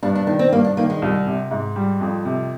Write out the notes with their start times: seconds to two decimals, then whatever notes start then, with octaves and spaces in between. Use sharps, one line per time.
0.03 G2 D4
0.15 D4
0.27 D#3 D4
0.39 C4
0.52 G2 A#3
0.65 D4
0.77 D#3 A#3
0.90 G#3
1.02 C2
1.27 C3
1.51 G#2
1.76 G3
2.01 F2
2.25 C3